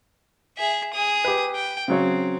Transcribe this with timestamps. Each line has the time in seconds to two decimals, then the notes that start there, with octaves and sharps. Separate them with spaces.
0.57 G#4 E5
0.93 G#4 D#6
1.25 G4 B4
1.55 G5
1.88 C#3 F#3 C4 C#5